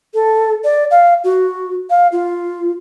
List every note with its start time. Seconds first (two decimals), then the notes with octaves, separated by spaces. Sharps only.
0.14 A4
0.64 D5
0.91 F5
1.24 F#4
1.90 F5
2.12 F4